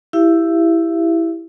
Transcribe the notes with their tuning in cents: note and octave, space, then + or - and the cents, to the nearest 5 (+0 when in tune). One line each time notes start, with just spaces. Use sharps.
E4 +0 G4 +0 E5 +45